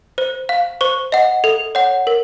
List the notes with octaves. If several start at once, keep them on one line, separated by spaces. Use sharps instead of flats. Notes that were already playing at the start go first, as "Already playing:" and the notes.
C5
F5
C5 C#6
D#5 F#5
A4
C#5 F#5
A#4